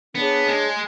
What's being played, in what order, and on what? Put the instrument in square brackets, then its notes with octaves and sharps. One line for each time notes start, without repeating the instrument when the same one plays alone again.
[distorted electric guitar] B3 [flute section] D4 G#4 C#5
[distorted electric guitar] G#3